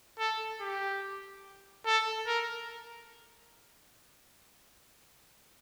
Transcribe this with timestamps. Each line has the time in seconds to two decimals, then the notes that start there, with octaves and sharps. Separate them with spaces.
0.19 A4
0.61 G4
1.86 A4
2.27 A#4